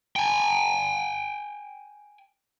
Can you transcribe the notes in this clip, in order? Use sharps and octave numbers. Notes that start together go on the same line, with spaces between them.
G5 G#5